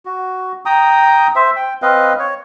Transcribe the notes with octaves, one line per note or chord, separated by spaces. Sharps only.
F#4
G5 A#5 D#6
C5 E5
G5
C4 B4 D#5 F5
C#5